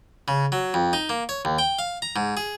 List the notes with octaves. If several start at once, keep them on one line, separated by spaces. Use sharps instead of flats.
C#3
F#3
F2
D#4
A#3
C#5
D#2
G5
F5
A#5
G#2
G#4